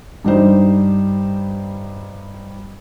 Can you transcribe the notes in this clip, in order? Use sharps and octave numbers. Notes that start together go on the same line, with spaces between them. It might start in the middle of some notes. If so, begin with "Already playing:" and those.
G2 G3 D#4 C5